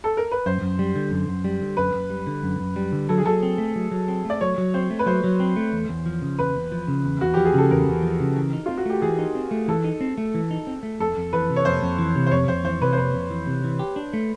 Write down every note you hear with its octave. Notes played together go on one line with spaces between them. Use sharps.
A4
A#4
B4
F#2 C5
F#2
G3
D3
F#2
F#2
G3
D3
F#2 B4
F#2
G3
D3
F#2
F#2
G3
D3
F#3 A4
G#4
F#3 A4
C4
A3
F#3
F#3
C4
A3 D5
F#3 C#5
F#3
C4 C5
A3
B4
F#3 C5
F#3
C4
A3
E2
E2
F3
C#3
E2 B4
E2
F3
C#3
E2
E2 F#4
F3 G4
G#4
C#3 A4
E2 A#4
E2
F3
C#3
E3
D#4
C4 F4
F#4
A3 G4
E3 G#4
D#4
C4
A3
E3 A4
D#4
C4
A3
E3
D#4
C4
A3
F2 A4
F2
E3 B4
C3
C#5
F2 C5
F2
E3
C3
C5
F2 C#5
F2 C5
E3 C5
C3 B4
C5
F2 B4
F2
E3
C3
E3
G4
D4
A3